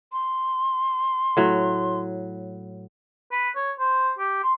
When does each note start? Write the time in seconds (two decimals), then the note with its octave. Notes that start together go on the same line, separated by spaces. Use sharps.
0.12 C6
1.37 A2 F#3
3.32 B4
3.56 C#5
3.79 C5
4.18 G4
4.43 C6